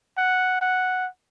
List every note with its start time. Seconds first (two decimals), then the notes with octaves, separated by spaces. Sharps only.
0.18 F#5
0.61 F#5